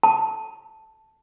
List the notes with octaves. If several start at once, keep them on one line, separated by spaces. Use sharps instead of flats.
A5